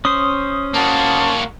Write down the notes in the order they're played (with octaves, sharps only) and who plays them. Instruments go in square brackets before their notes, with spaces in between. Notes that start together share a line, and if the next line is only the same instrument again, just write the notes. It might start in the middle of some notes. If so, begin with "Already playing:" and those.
[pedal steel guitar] C#4 C5 [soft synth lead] D#6
[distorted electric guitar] A#3 F#4 [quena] A5